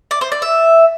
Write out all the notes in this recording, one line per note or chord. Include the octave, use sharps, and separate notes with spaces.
D5
C5
D5
E5